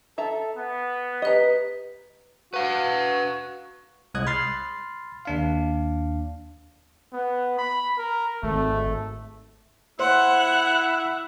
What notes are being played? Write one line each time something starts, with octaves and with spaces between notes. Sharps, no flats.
A4 E5 A5 A#5
B3
G4 B4 D#5 A#5
F#4 B4 F5
C2 G#3 D#6 F#6 G#6
B5 C6 F6 A6 C7
D#2 D4 F5
B3
B5
A#4
G#1 A3
E4 C5 F#5